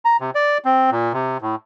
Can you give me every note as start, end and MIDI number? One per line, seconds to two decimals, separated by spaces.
0.05 0.17 82
0.20 0.30 48
0.35 0.58 74
0.65 0.90 60
0.91 1.12 46
1.13 1.37 48
1.41 1.55 45